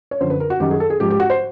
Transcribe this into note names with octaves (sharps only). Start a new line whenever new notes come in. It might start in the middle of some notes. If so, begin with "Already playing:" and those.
C#5
F#2 D3 F3 C5
B4
A#4
F#4
F#2 D#3 F#3 G4
G#4
A4
G#4
G#2 F3 G4
G4
F#4
C5